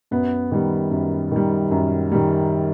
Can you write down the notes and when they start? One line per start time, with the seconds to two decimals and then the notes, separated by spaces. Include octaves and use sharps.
0.11 F#2 B3
0.52 D#3 G3
0.91 F#2
1.32 D#3 G3
1.71 F#2
2.12 D#3 G3